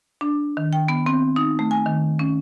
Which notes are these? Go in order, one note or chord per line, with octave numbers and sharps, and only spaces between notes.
D4
D#3
G5
B3
C4
D#4
A3
G#5
D#3
C#4